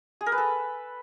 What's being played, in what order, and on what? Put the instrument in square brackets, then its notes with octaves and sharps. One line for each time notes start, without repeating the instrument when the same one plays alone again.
[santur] G#4
A#4
B4
A4